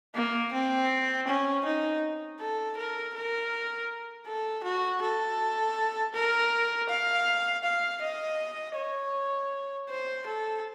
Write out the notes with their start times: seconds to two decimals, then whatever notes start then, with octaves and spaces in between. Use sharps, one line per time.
0.15 A#3
0.53 C4
1.27 C#4
1.65 D#4
2.40 A4
2.77 A#4
3.15 A#4
4.27 A4
4.64 F#4
5.02 A4
6.15 A#4
6.89 F5
7.64 F5
8.02 D#5
8.76 C#5
9.89 C5
10.27 A4